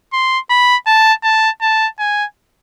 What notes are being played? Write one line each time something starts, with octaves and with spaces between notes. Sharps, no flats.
C6
B5
A5
A5
A5
G#5